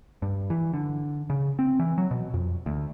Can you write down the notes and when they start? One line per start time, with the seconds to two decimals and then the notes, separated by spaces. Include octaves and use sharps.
0.22 G2
0.50 E3
0.74 D3
1.30 C#3
1.59 C4
1.79 E3
1.98 F#3
2.11 B2
2.34 F2
2.66 D2